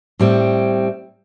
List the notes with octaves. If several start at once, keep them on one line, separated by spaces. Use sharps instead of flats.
A2 G3 C4